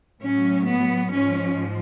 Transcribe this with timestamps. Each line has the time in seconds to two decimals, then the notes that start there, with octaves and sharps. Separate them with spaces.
0.21 A2 F#3 C#4
0.66 B3
1.12 G#2 F3 C#4